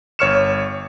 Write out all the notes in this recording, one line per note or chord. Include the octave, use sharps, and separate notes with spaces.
G1 C#5 C#6 F6 C#7 E7